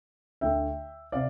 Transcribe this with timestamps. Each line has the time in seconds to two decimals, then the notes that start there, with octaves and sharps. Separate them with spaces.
0.41 D2 D3 A3 E5 G5
1.12 C3 D5 F5